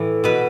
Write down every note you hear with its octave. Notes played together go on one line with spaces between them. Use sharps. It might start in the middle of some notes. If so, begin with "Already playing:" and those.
Already playing: A2 E3 A4
B2 B4